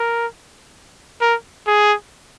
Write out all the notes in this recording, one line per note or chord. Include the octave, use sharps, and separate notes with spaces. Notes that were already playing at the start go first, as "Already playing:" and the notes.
Already playing: A#4
A#4
G#4